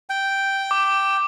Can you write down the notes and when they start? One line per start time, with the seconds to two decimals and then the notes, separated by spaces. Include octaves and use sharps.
0.10 G5
0.71 D6